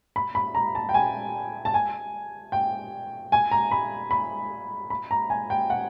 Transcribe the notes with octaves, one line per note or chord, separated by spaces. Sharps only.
B5
B5
A#5
A5
G5
G#5
A5
G#5
G5
G#5
A#5
B5
B5
B5
A#5
G#5
G5
F#5